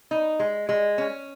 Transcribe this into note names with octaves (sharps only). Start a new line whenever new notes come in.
D#4
G#3
G#3
C#4